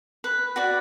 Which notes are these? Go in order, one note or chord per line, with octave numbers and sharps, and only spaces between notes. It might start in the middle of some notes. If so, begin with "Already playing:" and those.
B4
F#4 B4 D5